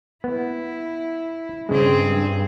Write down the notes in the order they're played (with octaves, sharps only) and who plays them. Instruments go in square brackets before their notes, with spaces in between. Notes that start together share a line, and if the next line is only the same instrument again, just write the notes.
[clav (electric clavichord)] B3 [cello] E4
[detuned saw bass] G2 [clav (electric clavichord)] C#3 G#3 [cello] C4 G#4